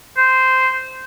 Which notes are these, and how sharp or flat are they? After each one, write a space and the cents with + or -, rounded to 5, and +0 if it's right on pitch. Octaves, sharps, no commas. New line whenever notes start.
C5 -10